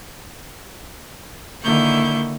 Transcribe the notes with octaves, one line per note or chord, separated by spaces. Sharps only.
D3 D#3 A#3 E4 C#6 G6